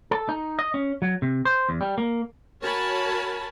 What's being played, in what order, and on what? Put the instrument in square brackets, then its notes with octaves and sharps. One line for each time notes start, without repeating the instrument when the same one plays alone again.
[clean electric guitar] A4
D#4
D#5
C#4
F#3
C3
C5
E2
G3
A#3
[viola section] F#4 A#4 C#5 G#5 A5 B5